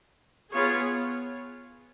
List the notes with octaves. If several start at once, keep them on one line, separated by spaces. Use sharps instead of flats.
B3 F4 G#4 C#5